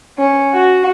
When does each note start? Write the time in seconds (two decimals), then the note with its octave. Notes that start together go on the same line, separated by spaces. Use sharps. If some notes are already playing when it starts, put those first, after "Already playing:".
0.18 C#4
0.53 F#4